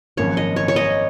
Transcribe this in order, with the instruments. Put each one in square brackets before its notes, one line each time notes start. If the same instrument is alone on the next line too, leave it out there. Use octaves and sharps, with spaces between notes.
[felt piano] G#1 F#2 F3 A#3 [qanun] C#5
[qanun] D#5
C#5
C#5
D#5